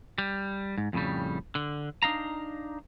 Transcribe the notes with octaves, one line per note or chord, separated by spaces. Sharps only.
G3
G#2
F2 A2 C#3 G3
D3
D4 D#4 F5 A#5